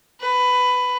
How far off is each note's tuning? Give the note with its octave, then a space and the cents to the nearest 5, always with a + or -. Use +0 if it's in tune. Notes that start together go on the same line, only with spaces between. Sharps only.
B4 +15